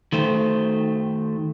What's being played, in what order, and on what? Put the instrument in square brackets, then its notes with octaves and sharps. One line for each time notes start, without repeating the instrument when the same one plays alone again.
[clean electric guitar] D#3 A3 C5